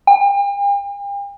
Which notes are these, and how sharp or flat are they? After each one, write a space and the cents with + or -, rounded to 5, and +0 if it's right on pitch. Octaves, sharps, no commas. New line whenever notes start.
G5 +45